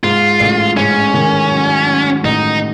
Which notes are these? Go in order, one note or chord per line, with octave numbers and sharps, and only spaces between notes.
G#2 F4
A1
G#2 C#4
D#3
F#3
F#3
A1 D#4